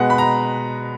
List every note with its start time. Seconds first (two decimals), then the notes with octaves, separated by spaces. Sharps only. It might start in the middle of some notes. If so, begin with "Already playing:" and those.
Already playing: B2 G#3 B3 F#5
0.10 B5
0.18 A#5